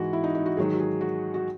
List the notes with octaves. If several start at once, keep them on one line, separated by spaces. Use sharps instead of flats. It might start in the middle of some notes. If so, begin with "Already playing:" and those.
Already playing: G#2 E3 E4 F#4
E4
D#4
D#4
F#4
G#2 D#3 F#3 G#4
F#4
G#4
F#4
F#4